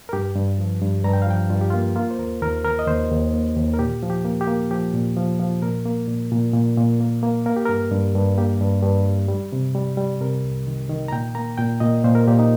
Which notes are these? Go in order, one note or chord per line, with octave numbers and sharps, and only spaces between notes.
A#4
G2 G4
G2
F3
G2
G2 A#5
G5
F5
F3 G5
G2 F4
G4
A#3 F4
A#3 F4
C5
D#2 A#4
D#2 A#4
D#3 A#4
D#5
D#2 C5
D#2
A#3
D#2
A#4
A#2 G4
F3
G4
A#3
G4
A#3
F3 G4
A#2
F3
F3
A#2 A#4
A#3
A#2
A#2
A#2
A#2
A#3
A#3
A#3 A#4
G4
G2 A#4
G2
G2
A#3 G4
G2
G2
G3
G3
C3
G3
G3
C3 A#4
C2
D#3
D#3
A#5
A#2 G5
A#3 A#5
A#2 G5
A#2 D#5
A#2 C5
A#4
A#2 G4
D#4